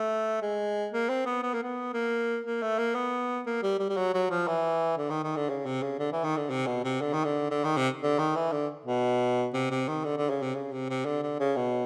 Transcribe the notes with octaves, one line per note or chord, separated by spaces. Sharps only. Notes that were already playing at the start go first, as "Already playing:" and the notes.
Already playing: A3
G#3
A#3
C4
B3
B3
A#3
B3
A#3
A#3
A3
A#3
B3
A#3
G3
G3
G3
F#3
F#3
F3
E3
D3
D#3
D#3
D3
C#3
C3
C#3
D3
E3
D#3
D3
C3
B2
C3
D3
D#3
D3
D3
D#3
C3
D3
D#3
E3
D3
B2
C3
C3
D#3
D3
D3
C#3
C3
C#3
C3
C3
D3
D3
C#3
B2